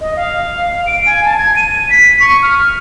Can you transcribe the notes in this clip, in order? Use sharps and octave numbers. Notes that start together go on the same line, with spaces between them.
D#5
F5
D7
G#5
A5
G#6
D#7
B6
C#6
F6